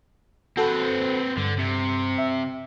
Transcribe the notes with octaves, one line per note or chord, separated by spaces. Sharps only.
C4 F#4 A4 B4
G2 D3
C3
E5